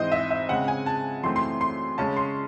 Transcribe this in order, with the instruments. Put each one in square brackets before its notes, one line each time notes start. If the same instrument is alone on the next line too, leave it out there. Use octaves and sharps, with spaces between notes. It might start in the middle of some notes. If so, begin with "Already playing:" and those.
Already playing: [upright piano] G#2 E3 C4 C5 D#5
E5
E5
C#3 G#3 C4 F#5
G#5
A5
F#2 E3 A3 C4 C6
C6
C6
C#3 G#3 C#4 A5
C6